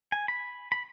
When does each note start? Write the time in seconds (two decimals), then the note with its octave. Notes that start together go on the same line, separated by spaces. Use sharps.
0.12 G#5
0.28 B5
0.72 B5